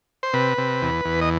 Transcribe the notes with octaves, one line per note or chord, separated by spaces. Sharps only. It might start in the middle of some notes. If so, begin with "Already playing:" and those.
C5
C3 B4
C3
E2
E2
D#5